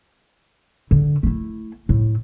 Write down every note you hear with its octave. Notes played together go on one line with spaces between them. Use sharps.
D3
A3 E4
A2